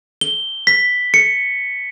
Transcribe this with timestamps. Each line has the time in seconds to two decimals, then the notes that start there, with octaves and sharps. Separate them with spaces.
0.21 G7
0.67 B6
1.14 C#7